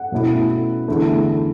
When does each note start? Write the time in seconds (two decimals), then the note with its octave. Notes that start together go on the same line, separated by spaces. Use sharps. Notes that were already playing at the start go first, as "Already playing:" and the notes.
Already playing: F#5
0.12 B2 A3 C#4 E4
0.88 E2 D3 A3 E4